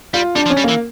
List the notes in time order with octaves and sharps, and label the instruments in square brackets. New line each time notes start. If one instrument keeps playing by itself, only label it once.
[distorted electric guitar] G3 [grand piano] F4
[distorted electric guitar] G3 [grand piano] D4
[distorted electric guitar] F3
[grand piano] C#4
[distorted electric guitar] G3
[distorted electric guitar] E3 [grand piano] A#3